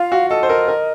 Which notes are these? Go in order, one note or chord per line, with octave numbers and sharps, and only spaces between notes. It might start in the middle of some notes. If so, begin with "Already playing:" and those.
Already playing: F4 F5
F#4
A4 D#5
C5
A#4
A#4